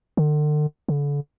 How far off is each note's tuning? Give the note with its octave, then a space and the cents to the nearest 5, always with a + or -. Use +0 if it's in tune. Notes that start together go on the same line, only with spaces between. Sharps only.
D3 +40
D3 -35